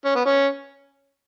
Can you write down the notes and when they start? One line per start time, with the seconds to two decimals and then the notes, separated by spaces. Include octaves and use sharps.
0.05 C#4
0.15 B3
0.25 C#4